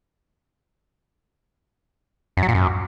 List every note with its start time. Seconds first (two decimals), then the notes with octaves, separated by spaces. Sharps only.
2.37 F#2
2.43 F#3
2.48 A#2
2.54 F#2